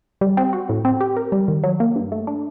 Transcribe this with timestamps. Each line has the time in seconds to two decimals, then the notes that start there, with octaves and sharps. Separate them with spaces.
0.21 G3
0.37 C4
0.53 F#4
0.69 A2
0.85 C4
1.01 G4
1.17 A#4
1.32 G3
1.48 D#3
1.64 F#3
1.80 A#3
1.96 G2
2.12 A3
2.27 D4